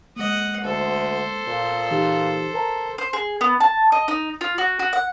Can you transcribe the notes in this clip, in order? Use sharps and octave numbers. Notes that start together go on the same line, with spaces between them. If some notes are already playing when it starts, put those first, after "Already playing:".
G#3 A#3 D#5 F#5
D2 A4 C5
A#2
E3 D#4 G4
A#4 A5 A#5
C5
G#4
B3
A5
D#5
D#4
F4
F#4
F#4
F#5